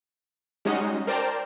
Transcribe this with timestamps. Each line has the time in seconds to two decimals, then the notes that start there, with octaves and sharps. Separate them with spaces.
0.65 G3 G#3 C#4 D#4 F#4 D#5
1.07 A#4 C5 D5 G5 A5 A#5